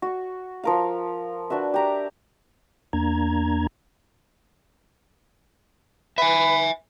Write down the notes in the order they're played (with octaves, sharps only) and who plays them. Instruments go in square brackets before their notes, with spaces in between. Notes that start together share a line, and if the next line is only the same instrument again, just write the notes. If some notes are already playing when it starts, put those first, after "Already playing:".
[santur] F#4 C#6
F3 A#4 F5
D4 F#4 B4 E5
G4 A#5 D6
[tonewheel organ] E2 A#3 D4 A#5 G#6
[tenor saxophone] B4 [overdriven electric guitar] E5 G#5